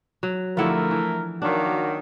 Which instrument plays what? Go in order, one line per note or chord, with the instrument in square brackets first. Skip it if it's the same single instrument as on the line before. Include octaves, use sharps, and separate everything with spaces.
[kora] F#3
[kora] D3 E4 F4 [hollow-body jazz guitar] F3 F#5 [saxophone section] A3 [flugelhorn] A#4
[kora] E3
[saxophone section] D#3 F#3 A#3 [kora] D4 [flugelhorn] F#4